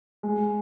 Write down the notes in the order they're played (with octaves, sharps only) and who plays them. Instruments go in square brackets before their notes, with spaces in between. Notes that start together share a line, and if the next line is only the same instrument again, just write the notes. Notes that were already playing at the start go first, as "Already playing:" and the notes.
[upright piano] G#3